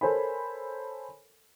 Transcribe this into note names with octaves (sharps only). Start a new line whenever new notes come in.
A4 A#4 C5 C#5 G#5 B5